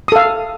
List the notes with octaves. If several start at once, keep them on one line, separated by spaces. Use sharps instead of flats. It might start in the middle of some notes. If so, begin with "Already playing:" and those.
A4 F5 D#6